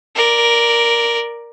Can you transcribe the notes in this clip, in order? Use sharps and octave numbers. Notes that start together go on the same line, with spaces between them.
A#4 D5